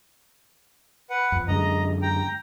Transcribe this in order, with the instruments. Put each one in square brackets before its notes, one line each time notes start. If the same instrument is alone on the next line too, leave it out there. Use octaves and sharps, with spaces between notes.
[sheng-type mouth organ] B4 F#5
[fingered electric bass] F2
[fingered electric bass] F#2 D3 G#3 [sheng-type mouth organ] D#5 A#5
[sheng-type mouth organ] G5 A#5